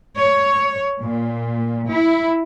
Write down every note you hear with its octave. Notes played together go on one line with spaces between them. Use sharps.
C#5
A#2
E4